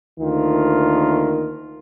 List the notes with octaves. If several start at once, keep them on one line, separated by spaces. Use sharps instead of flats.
D2 D#3 A#3 F4